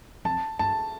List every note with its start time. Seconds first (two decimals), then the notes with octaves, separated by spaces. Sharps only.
0.25 F2 A5
0.59 G2 A5